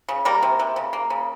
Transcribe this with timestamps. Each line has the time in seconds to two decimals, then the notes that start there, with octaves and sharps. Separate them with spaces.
0.09 C#3
0.25 G3 A#3 A#4
0.43 C3
0.59 C3
0.76 C#3
0.93 A#3
1.10 C#3